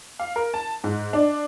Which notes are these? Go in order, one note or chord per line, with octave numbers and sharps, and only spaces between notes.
F5
A#4
A5
G#2
D4